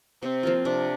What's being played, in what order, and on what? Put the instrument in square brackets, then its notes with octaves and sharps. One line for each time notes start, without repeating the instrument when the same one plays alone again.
[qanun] C3 [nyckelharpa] C4
[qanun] F3 A#3 F4
[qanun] C3 [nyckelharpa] D4